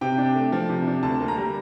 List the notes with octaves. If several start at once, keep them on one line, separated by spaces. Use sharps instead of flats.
C3 G5
D4
A3
F3
C3
D4
D2 A5
A#3
A#5
G3